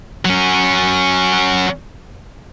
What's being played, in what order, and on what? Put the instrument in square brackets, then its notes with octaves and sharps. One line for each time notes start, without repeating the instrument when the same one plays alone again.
[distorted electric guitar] F#3 C#4